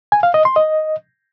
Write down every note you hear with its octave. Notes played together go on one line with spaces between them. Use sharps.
G#5
F5
D#5
C6
D#5